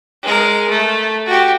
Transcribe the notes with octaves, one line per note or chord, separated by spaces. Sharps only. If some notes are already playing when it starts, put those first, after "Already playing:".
G#3 A#4
A3
F#4 G4